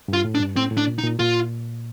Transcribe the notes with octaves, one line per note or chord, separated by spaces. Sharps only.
G2 F4
A2
D4
G2
A2 C4
A2
D4
A#2
D#4
A#2
A#2 F4